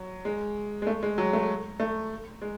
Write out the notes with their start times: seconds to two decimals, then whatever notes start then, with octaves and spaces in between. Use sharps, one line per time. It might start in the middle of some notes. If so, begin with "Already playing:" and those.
Already playing: F#3
0.25 G#3
0.82 G#3
0.87 A3
1.03 G#3
1.18 F#3
1.33 A3
1.80 A3
2.42 G#3